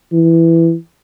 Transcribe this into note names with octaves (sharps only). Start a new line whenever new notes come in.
E3